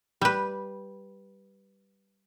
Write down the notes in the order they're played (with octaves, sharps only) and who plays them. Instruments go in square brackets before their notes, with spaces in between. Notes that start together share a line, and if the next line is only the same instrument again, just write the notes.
[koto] G3 B4